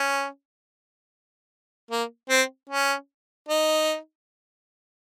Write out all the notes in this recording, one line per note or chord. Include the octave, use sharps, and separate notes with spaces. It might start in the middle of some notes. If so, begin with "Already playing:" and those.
Already playing: C#4
A#3
C4
C#4
D#4